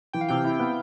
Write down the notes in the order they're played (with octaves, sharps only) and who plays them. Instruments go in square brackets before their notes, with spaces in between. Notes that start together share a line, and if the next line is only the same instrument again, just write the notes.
[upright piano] E3 [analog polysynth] G5
[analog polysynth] F5
[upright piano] C3 [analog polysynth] G5
[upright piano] E4
B3